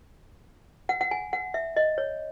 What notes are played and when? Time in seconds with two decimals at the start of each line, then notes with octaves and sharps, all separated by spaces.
0.89 F#5
1.01 F#5
1.11 G#5
1.33 F#5
1.54 E5
1.76 D#5
1.98 C#5